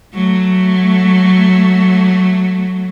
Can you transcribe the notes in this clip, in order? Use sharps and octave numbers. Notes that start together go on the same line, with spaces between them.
F#3 A3